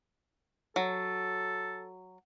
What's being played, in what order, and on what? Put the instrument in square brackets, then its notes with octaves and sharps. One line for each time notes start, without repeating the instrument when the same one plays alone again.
[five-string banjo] F#3 [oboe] A4